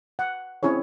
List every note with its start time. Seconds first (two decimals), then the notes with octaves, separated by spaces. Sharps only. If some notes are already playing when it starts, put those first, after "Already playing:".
0.19 F#5
0.63 C4 C#4 E4 G#4 C#5